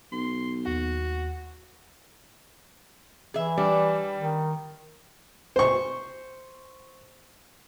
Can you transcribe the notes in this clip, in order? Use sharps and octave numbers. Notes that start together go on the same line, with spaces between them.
B1 C6
D#2 F#4 F#5
E3 G#4 E5
G3 D4
D#3
C5 C#6